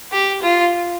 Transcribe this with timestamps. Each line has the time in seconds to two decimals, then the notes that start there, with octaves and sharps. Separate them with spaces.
0.12 G4
0.42 F4